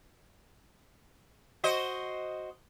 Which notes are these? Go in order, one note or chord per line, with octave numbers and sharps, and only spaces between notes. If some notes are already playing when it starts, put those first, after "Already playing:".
F#4 C5 D#5